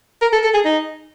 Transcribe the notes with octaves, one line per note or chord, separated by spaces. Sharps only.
A#4
A4
A4
G#4
D#4